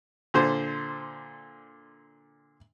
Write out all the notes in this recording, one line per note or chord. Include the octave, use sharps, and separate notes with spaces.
A#2 D3 C5